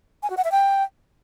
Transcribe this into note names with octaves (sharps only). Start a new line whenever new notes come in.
G#5
F#4
F#5
E5
G5